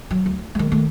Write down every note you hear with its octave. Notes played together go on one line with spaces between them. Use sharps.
F#3
D2
D#3 G#3
D#3 A3